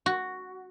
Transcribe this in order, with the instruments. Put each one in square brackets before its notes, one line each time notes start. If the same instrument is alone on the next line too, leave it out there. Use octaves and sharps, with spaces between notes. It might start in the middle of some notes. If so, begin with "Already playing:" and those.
[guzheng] F#4